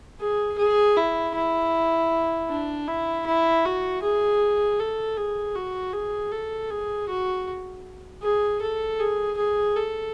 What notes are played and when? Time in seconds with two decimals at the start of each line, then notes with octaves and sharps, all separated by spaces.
0.20 G#4
0.58 G#4
0.97 E4
1.35 E4
2.49 D4
2.87 E4
3.26 E4
3.65 F#4
4.02 G#4
4.79 A4
5.17 G#4
5.55 F#4
5.93 G#4
6.32 A4
6.70 G#4
7.08 F#4
8.22 G#4
8.61 A4
8.99 G#4
9.37 G#4
9.76 A4